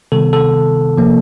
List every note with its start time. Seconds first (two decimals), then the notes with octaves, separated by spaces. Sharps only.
0.12 C3 D#3 G3 B3 A4
0.33 A4
0.97 C3 F3 A#3